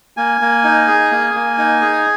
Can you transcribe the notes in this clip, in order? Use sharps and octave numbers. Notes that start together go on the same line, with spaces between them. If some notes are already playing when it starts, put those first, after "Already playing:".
A#3 G#5
A#3
D#4
G#4
A#3
A#3
D#4
G#4